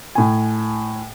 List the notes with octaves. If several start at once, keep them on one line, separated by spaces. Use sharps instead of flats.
A2 G#5